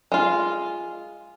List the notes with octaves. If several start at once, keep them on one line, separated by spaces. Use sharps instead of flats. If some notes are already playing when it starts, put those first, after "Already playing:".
G#3 F4